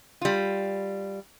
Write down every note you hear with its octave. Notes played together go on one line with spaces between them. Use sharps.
G3 F4